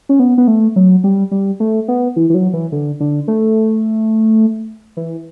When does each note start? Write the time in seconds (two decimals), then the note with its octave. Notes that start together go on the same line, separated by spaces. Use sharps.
0.09 C#4
0.19 B3
0.38 B3
0.48 A3
0.76 F#3
1.04 G3
1.31 G3
1.60 A3
1.88 B3
2.16 E3
2.30 E3
2.34 F#3
2.53 E3
2.72 D3
3.00 D3
3.28 A3
4.97 E3